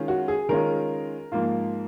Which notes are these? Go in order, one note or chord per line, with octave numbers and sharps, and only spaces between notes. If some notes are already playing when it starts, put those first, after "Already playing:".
Already playing: D#3 G#3 C#4 F4
F#4
G#4
D#3 G#3 C#4 F4 A#4
G#2 F3 A#3 F4